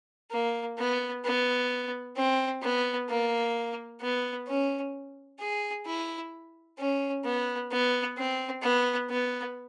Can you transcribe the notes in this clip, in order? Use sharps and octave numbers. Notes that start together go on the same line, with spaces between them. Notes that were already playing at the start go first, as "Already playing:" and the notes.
A#3
B3
B3
C4
B3
A#3
B3
C#4
G#4
E4
C#4
B3
B3
C4
B3
B3